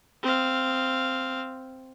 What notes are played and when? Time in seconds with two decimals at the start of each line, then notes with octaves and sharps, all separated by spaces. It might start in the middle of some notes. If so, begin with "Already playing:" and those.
0.22 C4 F5